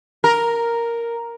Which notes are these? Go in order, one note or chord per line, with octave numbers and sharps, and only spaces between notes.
A#4